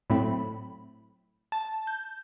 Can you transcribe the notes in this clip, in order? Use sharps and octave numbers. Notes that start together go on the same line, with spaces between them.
A2 F#3 A3 C4 B5
A5
G6